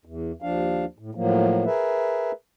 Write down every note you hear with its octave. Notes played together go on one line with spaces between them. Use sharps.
E2
D#2 F3 D4 F5
A2
A2 F3 F#3 A#3
G#4 A#4 B4 E5